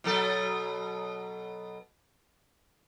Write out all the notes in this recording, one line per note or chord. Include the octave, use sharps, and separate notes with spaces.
B2 F#3 A4